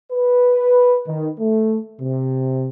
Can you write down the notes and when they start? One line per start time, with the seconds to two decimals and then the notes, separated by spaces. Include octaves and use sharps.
0.12 B4
1.07 D#3
1.40 A3
2.01 C3